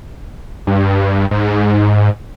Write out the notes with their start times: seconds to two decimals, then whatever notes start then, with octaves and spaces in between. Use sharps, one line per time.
0.67 G2
1.31 G#2